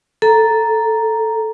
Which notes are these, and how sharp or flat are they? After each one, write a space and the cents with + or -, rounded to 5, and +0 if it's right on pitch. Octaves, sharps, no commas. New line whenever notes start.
A4 +0 A#5 +0